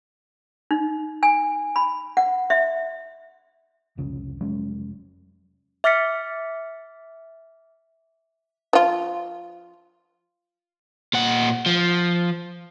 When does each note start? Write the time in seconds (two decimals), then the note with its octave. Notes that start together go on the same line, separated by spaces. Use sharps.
0.71 D#4
1.23 G#5
1.76 B5
2.17 F#5
2.50 E5
3.97 F1 C2 C#3 F3
4.41 F1 F#3 G#3 C#4
5.84 E5 D6 F6 A6 B6 C#7
8.73 F3 F4
11.13 A#2 F#5
11.66 F3